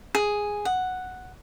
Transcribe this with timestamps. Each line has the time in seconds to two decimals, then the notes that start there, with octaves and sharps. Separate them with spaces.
0.15 G#4
0.65 F#5